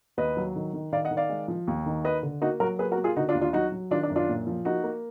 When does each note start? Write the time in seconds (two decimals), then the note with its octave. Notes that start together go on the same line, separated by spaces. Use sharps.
0.17 D#2 B4 D#5
0.37 F#3
0.56 D#3
0.73 D#3
0.93 D#3 D5 F5
1.05 D#5 F#5
1.11 D#3
1.17 D5 F5
1.29 G#3
1.48 F3
1.67 D#2
1.86 D#3
2.04 A#3 B4 D#5
2.23 D3
2.41 A#3 D#4 F#4
2.60 F#3 F#4 A#4
2.79 A#3 G#4 B4
2.92 F#4 A#4
2.97 A#3
3.04 F4 G#4
3.16 D3 D#4 F#4
3.29 D4 F4
3.35 D#2
3.41 D4 F4
3.53 F#3 D#4 F#4
3.72 F#3
3.91 D#3 D4 F4
4.03 D4
4.10 F#2
4.16 D4 F4
4.29 A#2
4.47 F3
4.65 A#3 D#4 F#4
4.84 A#3